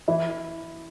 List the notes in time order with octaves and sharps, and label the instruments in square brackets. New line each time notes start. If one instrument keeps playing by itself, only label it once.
[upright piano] E3 [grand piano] E4